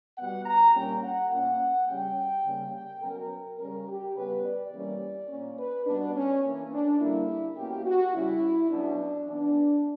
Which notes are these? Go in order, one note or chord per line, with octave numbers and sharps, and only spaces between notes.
B2 G3 B3 F#5
A#5
A#2 G3 A#3 C#4 G5
F#5
A#2 A#3 C#4 F#5
C#3 G3 C#4 G5
C#3 G3 A#3 C#4
G5
B2 F#3 C#4 A#4
C#3 G3 C#4 A#4
G4
C#3 G3 B3 B4
D5
E3 G3 A#3 C#4
A#2 A#3 C#4
B4
B2 G3 B3 D4
C#4
E3 A#3 C#4
D4
D3 G3 A#3 E4
B2 A#3 C#4 G4
F#4
C#3 G3 C#4 E4
B2 F#3 C#4 D4
E3 B3 D4